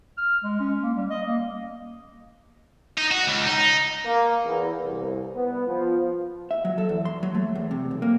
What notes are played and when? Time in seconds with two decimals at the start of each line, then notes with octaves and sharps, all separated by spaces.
0.17 F6
0.43 G#3
0.60 C#4
0.83 A#3
0.97 G3
1.10 D#5
1.27 A#3
2.98 D#4
3.11 F#4
3.27 C#2
3.47 D#4
4.05 A#3
4.45 E2
4.85 C2
5.36 B3
5.68 F3
6.51 E5
6.65 F#3
6.78 A4
6.89 E2
7.05 C6
7.23 F#3
7.35 A3
7.55 E2
7.71 C3
7.91 B1
8.02 A#3